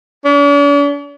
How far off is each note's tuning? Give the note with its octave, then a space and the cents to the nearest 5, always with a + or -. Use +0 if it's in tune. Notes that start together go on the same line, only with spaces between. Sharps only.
D4 -45